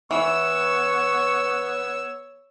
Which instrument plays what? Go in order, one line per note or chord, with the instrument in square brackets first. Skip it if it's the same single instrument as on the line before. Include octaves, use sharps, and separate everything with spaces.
[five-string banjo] E3 [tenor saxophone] B3 [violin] C#5 E6 [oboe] C#6